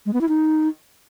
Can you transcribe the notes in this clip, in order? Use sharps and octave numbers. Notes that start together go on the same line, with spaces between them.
G#3
B3
E4
D#4